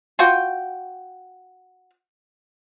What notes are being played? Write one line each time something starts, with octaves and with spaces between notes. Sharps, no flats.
F4 F#4 G5